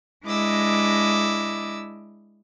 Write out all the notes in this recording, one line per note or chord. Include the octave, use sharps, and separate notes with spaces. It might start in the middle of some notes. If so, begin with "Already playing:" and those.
G#3 D4 E4 D#5 D6 E6